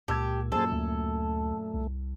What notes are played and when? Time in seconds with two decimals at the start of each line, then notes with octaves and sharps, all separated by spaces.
0.08 C#2 A#2 G4 A5 E6 G#6
0.52 F#2 A#2 G#4 A4 C5 A5
0.72 D2 A3
1.74 C2